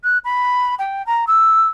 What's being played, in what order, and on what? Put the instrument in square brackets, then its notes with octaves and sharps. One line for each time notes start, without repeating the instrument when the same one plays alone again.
[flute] F#6
B5
G5
A#5
E6